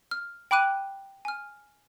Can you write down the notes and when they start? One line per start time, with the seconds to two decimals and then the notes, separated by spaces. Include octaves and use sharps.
0.11 F6
0.51 G5 B5 D6 F#6 D#7
1.25 G#5 F6